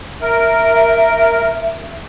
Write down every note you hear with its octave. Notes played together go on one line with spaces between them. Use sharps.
A#4 E5